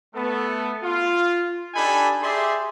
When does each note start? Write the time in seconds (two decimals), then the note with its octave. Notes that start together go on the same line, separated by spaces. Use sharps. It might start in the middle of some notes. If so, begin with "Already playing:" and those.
0.14 A3 B3 A4
0.83 F4
1.75 D4 D#4 G4 A4 G#5 B5
2.22 G4 G#4 D5 E5 C6